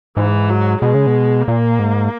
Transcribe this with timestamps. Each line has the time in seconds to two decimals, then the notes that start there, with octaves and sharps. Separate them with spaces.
0.17 G#2 E3
0.49 F#3
0.82 B2 G#3
0.94 C#3
1.07 B2
1.47 A#2 A#3
1.79 G#2